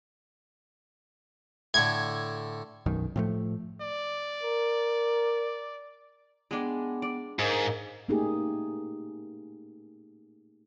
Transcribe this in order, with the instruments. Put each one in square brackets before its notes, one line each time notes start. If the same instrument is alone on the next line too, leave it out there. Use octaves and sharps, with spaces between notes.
[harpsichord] A2 D3 [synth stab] G#6
[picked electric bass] B1 F#2 D#3
A2 F3 A3
[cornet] D5
[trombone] A#4
[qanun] G#3 D4 [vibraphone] B3 F#5 G5
[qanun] D5
[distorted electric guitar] G#2 [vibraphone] A#4 D#5 F5
[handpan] A3 A#3 C#4 D#4 G4 G#4